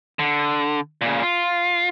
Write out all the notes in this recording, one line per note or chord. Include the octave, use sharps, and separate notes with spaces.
D3
A#2 C#3
F4